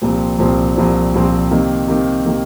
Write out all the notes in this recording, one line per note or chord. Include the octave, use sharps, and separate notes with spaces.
C2 A#2 F3 C4
C2 A#2 F3 C4
C2 A#2 F3 C4
C2 A#2 F3 C4
C3 D#3 A#3
C3 D#3 A#3
C3 D#3 A#3